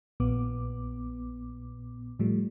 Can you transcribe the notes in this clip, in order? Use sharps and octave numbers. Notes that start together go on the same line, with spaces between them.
A#1 A#2 B3 D6
A2 F3 G3 A3